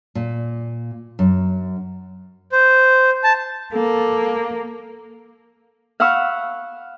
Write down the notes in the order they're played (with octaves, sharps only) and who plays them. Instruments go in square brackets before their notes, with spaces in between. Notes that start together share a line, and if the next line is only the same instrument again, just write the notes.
[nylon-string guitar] A#2
F#2
[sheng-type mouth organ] C5
A5
[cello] A#3 [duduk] A4
[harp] F5 F#5 B5 C#6 E6